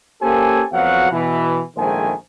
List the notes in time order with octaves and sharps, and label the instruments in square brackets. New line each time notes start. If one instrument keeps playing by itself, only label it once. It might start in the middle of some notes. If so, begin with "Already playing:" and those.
[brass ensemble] A#3 C#4 G4 A4 C5 G#5
F2 F#3 B3 F#4 F5 F#5
B2 E3
A#1 D#3 G#3 A3 C5 G#5